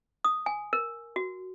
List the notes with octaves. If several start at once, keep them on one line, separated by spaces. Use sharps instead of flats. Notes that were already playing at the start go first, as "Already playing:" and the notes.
D#6
G#5
A#4
F#4